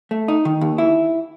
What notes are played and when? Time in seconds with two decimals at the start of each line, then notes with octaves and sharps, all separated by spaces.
0.11 A3
0.28 D#4
0.45 D#3
0.61 D#2
0.78 E4